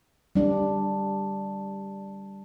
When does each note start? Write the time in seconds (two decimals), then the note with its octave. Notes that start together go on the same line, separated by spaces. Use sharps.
0.35 G3 D4